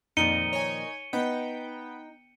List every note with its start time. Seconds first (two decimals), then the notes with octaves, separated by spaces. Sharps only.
0.17 F2 A#2 D#3 F3 D#4 C#7 D#7 G7
0.53 C#5 G#5
1.13 B3 D#4 G5